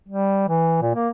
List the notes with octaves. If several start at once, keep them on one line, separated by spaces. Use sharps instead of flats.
G3
E3
A#2
A#3